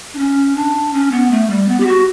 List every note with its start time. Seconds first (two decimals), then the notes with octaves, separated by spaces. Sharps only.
0.14 D4
0.18 C#4
0.56 D4
0.93 C#4
1.12 B3
1.31 A3
1.50 G3
1.68 B3
1.80 G4
1.87 F#4